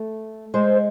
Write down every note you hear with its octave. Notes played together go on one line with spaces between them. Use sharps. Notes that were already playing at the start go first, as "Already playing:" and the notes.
Already playing: A3
G#3 C5